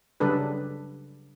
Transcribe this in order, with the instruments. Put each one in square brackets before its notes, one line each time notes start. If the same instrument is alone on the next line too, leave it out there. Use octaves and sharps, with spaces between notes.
[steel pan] C#3 F#3 G3 D4 A4 B4